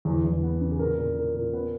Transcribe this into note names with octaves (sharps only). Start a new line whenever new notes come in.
E2 G#4
E2
B3
C#3
G#4
A#2 A#4
A#2
A#2
A#2
B3 B4